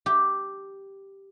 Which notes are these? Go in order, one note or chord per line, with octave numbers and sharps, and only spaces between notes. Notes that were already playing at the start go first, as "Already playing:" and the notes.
G4